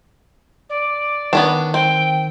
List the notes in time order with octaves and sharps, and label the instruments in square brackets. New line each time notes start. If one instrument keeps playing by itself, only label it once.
[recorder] D5
[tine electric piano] D#3 [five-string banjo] B3 C#4 D4
[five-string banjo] C4 [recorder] G5